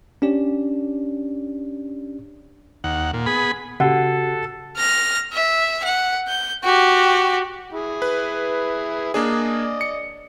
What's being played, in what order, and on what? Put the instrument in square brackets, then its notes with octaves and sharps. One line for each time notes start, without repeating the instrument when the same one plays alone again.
[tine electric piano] C#4 D4 G4 D5
[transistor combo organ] D#2 F#5
A#2
B3 G#4 B5
[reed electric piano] C#3 [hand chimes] F#4 [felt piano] G4 F#5 [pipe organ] A4
[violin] F6 A#6
E5
F#5
G6
F#4 G4
[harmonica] E4 G#4
[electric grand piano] B4
[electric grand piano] A#3 D4 G#4 [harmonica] D5 D#5
[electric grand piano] C#7